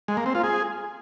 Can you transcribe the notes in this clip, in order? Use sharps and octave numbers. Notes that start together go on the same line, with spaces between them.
G#3
A#3
C4
F4
G#4